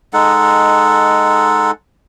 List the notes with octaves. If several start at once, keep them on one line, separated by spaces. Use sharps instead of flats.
G#3 D#4 A4 F#5